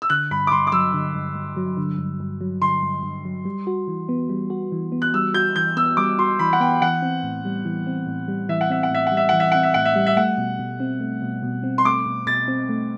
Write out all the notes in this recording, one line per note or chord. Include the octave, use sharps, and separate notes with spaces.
E6
D3 F#6
G2 B5
D6
G2 C6
D6
F#3 E6
D3
G2
G2
F#3
D3
G2
G2
F#3
D3 C6
G2
G2
F#3
G3
F#4
E3
B3
G3
F#4
E3
B3
F#6
G3 E6
F#4 G6
E3 G6
B3 E6
G3 D6
F#4 C6
E3 B5
F#5
B3 G5
E3 F#5
C4
A2
G3
E3
C4
A2
G3
E3 E5
F#5
C4 E5
F#5
A2 E5
F#5
G3
E5
E3 F#5
E5
C4 F#5
E5
A2 F#5
E5
G3
E5
A3 F#5
B2
B2
C4
A3
B2
B2
C4
C6
A3 D6
B2
B2 A6
C4
A3